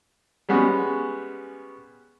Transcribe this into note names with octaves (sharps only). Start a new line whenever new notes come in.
G3 G#3 B3 C#4 F#4